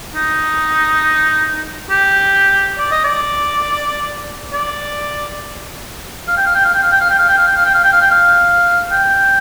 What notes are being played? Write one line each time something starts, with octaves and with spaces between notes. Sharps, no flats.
D#4
G4
D5
D#5
D5
D5
F5
G5
F5
G5
F5
G5
F5
G5
F5
G5
F5
G5
F5
G5
F5
G5
F5
G5
F5
G5
F5
G5